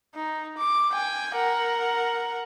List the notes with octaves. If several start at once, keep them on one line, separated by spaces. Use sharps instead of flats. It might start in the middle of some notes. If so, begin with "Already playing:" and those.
D#4
D6
G5 G#5
A#4 F#5